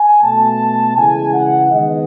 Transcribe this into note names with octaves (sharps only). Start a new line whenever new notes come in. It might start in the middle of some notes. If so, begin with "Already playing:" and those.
Already playing: G#5
B2 A3 A5
C#3 E3 G#3 G#5
F#5
D#3 G#3 B3 D#5